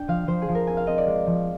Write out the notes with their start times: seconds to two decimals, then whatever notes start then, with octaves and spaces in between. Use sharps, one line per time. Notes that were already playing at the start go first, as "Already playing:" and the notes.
Already playing: D4 G5
0.08 F3 F5
0.27 F3 C5
0.42 G#4
0.49 F3
0.55 A#4
0.67 C4 G#5
0.77 F5
0.87 C4 D#5
0.98 D5
1.07 G#3
1.27 F3